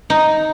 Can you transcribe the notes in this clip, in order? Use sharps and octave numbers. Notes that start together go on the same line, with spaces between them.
D#4